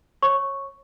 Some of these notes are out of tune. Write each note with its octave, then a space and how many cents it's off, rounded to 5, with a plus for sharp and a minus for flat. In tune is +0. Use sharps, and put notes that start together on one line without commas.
C#5 -20 C#6 +0